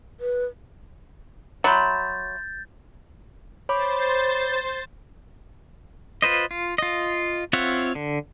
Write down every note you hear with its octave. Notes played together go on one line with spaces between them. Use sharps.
B4
F#3 E5 B5 C6 G6 A6
C5 C#5 B5 D6 A6
F4 B4 C5 D#5
F4
F4 D#5
C4 F4 C#5 E5 F#5
D3